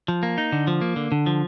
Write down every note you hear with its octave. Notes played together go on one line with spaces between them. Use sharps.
F3
A#3
D#4
D3
F3
A#3
D3
D3
F3